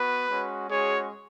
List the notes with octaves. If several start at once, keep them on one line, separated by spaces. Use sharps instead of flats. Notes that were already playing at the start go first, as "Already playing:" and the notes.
Already playing: B3 F#4 B4
G#3 C#4 F#4
G#3 C#4 F#4 G#4 C#5